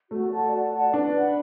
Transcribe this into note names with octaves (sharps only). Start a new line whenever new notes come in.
A3 F#4
D5 F#5 A5
F#4
D5 F#5 A5
D4 B4
F#5 B5